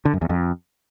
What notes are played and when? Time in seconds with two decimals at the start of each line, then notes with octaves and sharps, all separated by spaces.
0.05 D3
0.13 F#2
0.21 E2
0.29 F2